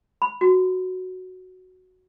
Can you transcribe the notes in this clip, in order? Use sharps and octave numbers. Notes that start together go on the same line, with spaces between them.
B5
F#4